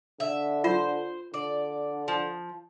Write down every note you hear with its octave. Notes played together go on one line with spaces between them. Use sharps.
D3 E5
F4 C5
D3 D5
F3